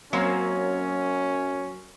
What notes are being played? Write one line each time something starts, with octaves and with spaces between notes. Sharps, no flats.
F#2 F#3 A#3 C4 C#4